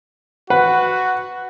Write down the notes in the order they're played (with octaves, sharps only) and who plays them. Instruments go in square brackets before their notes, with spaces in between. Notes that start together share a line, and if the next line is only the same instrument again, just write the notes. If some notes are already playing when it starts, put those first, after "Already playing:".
[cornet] F#4 [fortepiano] B4 F#5